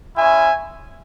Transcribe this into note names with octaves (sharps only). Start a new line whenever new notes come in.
G#3 C#4 E4 E5 G#5